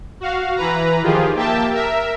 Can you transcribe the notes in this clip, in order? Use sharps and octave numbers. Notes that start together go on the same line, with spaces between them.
F#4 F5
E3 B4 A#5
D#3 F3 F4 G4 G#4
A#3 G4 E5 G5 A5
A#4 E5